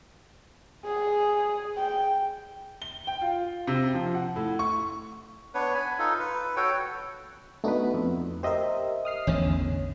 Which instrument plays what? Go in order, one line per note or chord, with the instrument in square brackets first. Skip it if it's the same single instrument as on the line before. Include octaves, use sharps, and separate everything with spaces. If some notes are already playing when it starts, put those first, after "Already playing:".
[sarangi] G#4
G5
[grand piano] G7
G5
F4
C3
F3
F#5
A2
C#6
[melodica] B3 D4 B4 C#5
G#5 B5
D#4 F4 A4
B4
F#4 A4 C#5 G5
[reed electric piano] A3 B3 B4 [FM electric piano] D4 D#4 F#4
[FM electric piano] F2
[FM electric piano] G4 A#4 [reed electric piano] C5 D#5 E5
[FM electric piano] D#6 F6 C7
[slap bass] A1 E2 D3 [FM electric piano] C#4